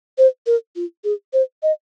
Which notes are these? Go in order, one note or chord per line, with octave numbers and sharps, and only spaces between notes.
C5
A#4
F4
G#4
C5
D#5